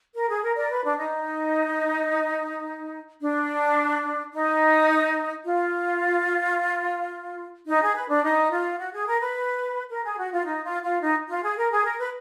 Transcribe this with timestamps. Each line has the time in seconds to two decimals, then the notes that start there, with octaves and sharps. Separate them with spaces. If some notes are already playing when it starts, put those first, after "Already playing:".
0.14 A#4
0.28 G#4
0.42 A#4
0.56 A#4 D5
0.70 B4
0.84 D4
0.98 D#4
3.21 D4
4.32 D#4
5.44 F4
7.67 D#4
7.81 G#4
7.95 B4
8.09 D4
8.23 D#4
8.50 F4
8.79 F#4
8.92 G#4
9.06 A#4
9.20 B4
9.90 A#4
10.04 G#4
10.17 F#4
10.32 F4
10.45 D#4
10.64 F4
10.82 F4
11.01 D#4
11.29 F4
11.43 G#4
11.57 A#4
11.71 G#4
11.85 A#4
11.99 B4